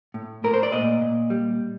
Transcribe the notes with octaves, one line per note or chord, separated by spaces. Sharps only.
A2
A2 A#4
C5
D5
A#2 D#5
A#2
G3